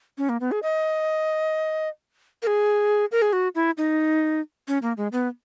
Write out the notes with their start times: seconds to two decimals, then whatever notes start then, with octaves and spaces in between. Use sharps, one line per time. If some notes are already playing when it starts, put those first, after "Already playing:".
0.18 C#4
0.29 A#3
0.41 B3
0.52 G#4
0.63 D#5
2.43 A#4
2.47 G#4
3.12 A#4
3.22 G#4
3.33 F#4
3.55 E4
3.78 D#4
4.68 C#4
4.82 A#3
4.97 G#3
5.12 B3